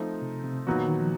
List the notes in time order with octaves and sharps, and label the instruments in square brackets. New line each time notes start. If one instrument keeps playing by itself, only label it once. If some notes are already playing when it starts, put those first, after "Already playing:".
Already playing: [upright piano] F3 A3 C4 D#4
[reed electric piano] C3
C3
[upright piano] A#2 F#3 B3 D#4 F#4 [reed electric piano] E3
[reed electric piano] D#3
D#3
F3